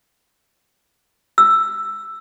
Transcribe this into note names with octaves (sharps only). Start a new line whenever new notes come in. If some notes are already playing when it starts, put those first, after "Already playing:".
E6